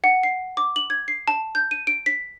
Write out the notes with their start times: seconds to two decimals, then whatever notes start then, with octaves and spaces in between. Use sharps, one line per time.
0.04 F#5
0.23 C7
0.57 D6
0.76 F#7
0.90 G#6
1.08 C7
1.28 A5
1.55 G6
1.71 D#7
1.87 D7
2.06 B6